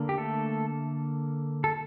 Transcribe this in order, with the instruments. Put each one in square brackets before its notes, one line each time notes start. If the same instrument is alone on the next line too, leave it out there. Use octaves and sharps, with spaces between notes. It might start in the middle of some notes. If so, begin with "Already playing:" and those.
Already playing: [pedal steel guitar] D3 A#3
G4
A3 A4
A4